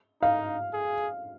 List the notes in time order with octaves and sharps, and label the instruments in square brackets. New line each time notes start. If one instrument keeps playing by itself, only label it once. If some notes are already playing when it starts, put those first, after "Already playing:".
[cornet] D#4 [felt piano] F5
[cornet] G#4